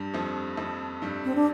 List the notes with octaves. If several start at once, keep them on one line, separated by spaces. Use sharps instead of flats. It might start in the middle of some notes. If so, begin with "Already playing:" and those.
Already playing: G2 G3
F2 F3
F2 F3
G2 G3
C4
D4